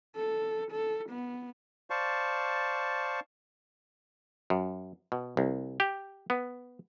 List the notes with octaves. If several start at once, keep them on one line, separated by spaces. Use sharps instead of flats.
A4
A4
B3
C5 D5 F5 A5 C#6
F#2
B2
C2
G4
B3